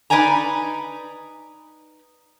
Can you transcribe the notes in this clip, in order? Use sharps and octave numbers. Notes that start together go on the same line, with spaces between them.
D#4 B4 D5 D#5 G#5 A#5